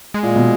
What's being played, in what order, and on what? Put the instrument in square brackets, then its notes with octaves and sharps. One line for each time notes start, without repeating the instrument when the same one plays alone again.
[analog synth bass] G#3
[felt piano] A#2
B2